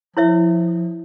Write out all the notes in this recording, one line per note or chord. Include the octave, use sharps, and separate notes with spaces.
F3 E4 C#5 E5